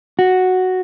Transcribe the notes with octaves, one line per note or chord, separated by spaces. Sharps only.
F#4